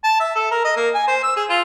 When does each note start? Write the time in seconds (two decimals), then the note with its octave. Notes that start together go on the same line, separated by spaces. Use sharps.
0.04 A5
0.20 E5
0.35 A4
0.51 A#4
0.65 D#5
0.76 A#3
0.94 G#5
1.08 C5
1.23 E6
1.36 G#4
1.50 F4